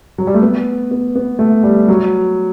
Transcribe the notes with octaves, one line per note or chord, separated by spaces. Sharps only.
F#3
G3
A3
B3
B3
B3
A3
G3
F#3